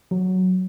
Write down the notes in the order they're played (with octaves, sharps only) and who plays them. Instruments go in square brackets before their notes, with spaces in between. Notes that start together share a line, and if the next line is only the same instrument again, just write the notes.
[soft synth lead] F#3